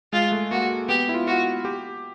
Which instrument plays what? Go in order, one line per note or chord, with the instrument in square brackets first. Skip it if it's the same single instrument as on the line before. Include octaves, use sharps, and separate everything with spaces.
[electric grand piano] G#3 [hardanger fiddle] F4
[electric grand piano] A3
[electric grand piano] A#3 [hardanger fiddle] F#4
[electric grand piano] B3 [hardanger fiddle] G4
[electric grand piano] E4
F4
[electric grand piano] F4 [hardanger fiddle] F#4
[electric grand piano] G4